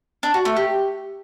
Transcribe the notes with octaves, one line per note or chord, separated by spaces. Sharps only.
D4
F#4
A3
G4